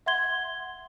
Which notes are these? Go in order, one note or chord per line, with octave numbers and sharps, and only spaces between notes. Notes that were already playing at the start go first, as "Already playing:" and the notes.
E5 F#5 C6 G#6 G7